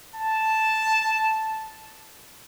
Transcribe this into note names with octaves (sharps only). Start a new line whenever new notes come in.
A5